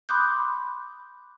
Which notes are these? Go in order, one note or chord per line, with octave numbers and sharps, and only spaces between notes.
B5 C6 D6 D#6 F#6 G6